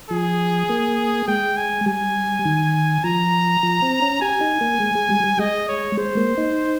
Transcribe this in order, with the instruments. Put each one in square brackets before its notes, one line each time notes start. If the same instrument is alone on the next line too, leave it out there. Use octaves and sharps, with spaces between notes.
[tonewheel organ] F3 [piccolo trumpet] G#4
[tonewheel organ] A#3
[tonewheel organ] G#3 [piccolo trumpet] G5
[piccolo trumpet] G#5
[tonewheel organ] G3 [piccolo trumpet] G#5
[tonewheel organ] D#3
[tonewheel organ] F3 [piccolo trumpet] A#5
[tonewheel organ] F3
C4
C#4
[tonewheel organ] G4 [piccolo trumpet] G#5
[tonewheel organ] D#4
A#3
G#3
G#3
G3
G3
[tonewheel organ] G#3 [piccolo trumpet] D#5
[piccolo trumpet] C#5
[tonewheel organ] G#3 [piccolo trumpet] C5
[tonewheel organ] A#3
D#4